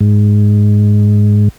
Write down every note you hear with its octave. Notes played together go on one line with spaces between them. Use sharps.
G#2